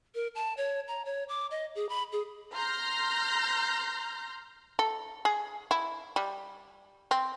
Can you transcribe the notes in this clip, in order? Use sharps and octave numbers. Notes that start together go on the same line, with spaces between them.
A#4
A5
C#5
A#5
C#5
D6
D#5
G#4
B5
G#4
A#5 C6 F6 G6 A#6
A4
G#4
E4
G3
C4